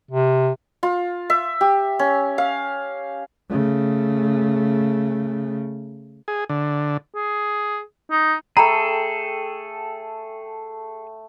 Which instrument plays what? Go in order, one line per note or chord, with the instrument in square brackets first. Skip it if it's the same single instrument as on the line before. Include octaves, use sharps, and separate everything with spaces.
[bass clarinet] C3
[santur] F4
E5
G4
C#4
F5
[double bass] C#3 A3
[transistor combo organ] G#4
D3
[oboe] G#4
D#4
[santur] A3 G5 [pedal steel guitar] G#4 A4 [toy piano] A#5 B5